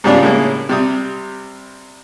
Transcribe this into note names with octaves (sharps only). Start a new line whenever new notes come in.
G#2 C#3 G3 B3 D4 F4
A2 C#3 G#3 A#3 G#4
C3 G3 D#6